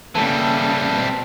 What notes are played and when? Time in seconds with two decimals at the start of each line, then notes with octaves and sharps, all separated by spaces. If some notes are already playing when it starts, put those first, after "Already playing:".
0.15 C#3 E3 G3 A#3 A4 A5
0.91 B2 C4